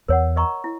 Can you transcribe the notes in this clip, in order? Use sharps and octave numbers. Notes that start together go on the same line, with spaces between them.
E2 A#4 C#5 F#5
A#4 D#5 A#5 C#6
E4